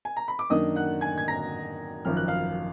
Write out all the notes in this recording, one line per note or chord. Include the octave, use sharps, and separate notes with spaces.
G#5
A#5
B5
D6
F#2 D#3 A#3 D4 D#5 D#6
F#5 F#6
G#5 G#6
G#6
A#5 A#6
G#1 F#2 F3 F6
F#6
F5 F6